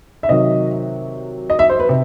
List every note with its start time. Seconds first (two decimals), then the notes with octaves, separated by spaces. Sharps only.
0.23 E5
0.29 C3 D#3 F#3 D#5
1.50 D#5
1.59 E5
1.70 C5
1.80 B4
1.89 C3